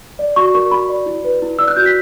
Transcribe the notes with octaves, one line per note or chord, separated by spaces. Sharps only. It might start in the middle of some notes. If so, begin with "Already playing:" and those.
D5
F#4 C#6
A#4 C#6
F#4 B5
D5
E4
B4
E4
D5 E6
F#6
F#4 G6
B6